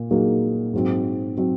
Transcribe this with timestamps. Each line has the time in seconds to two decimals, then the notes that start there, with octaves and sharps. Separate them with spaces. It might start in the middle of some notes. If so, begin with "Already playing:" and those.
Already playing: A#2 A#3
0.11 A#2 F#3 A#3 D#4 G#4
0.73 G#2 F#3 C4
1.37 F#3 C4